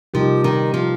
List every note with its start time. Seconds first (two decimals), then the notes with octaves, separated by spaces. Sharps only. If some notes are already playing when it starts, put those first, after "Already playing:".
0.14 C3 F3 G3 D#4 G4 A#4
0.44 D#3
0.74 F3